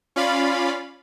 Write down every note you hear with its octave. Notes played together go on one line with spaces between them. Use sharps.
C#4 F4 D5 F5 B5